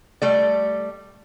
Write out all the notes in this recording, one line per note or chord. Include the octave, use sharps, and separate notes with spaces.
G3 A3 D5